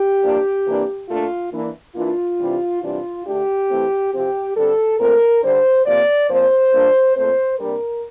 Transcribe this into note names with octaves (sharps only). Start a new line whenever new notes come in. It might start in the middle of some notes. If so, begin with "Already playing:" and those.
Already playing: G4
A2 F3 A#3 D4
C3 E3 A#3 D4
A#2 A3 D4 F4
E3 A#3 D4
E3 A#3 D4 F4
C3 E3 G3 D4
C3 E3 G3 D4 F4
D3 A3 D4 G4
E3 A3 C4
C3 F3 C4 G4
D3 G3 C4 A4
A#2 A3 C4 A#4
D3 G3 D4 C5
C3 F3 A#3 D5
A#2 F3 C4 C5
A#2 G3 A#3 D4
A#2 A3 C4 C5
C3 G3 A#3 D4 A#4